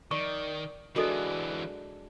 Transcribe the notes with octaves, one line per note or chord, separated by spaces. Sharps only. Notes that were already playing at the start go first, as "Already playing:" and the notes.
D#3 D5 C#6
E3 F#3 G#3 D4 F#4 A4 D#5